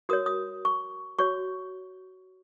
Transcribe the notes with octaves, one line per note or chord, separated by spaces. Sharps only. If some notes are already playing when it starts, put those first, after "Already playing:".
F#4 A#4 C#5 D#6
D#6
C#6
F#4 C#5 C#6